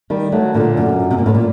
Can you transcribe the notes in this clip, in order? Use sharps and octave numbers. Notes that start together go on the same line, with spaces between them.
D#3 G3
F#3 A3
A#2 D3
F#2
C3
A#2
A2
A#2